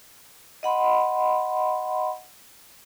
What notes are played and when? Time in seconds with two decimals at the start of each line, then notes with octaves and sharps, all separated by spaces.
0.63 D#5 F#5 B5 C6